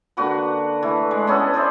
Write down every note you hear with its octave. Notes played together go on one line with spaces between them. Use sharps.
D3 A#3 F#4 B4
E3 A3
G#3
B3 C#4 G#4 A4
B4 C5 D5 E5